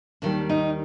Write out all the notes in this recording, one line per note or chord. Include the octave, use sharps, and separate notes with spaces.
D#2 D#3 G3 D4
D#4